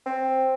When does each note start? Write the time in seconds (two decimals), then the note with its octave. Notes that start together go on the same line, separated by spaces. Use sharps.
0.06 C4